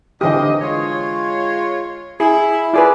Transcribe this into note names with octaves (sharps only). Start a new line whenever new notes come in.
D#2 D3 E3 C4 G4 D#5
G#3 F4 C#5
E4 G#4
E4 F4 G#4 B4 D5